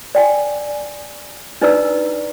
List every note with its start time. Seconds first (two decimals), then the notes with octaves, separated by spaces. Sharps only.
0.15 D5 G5 G#5
1.61 D4 D#4 B4 D5 A#5 E6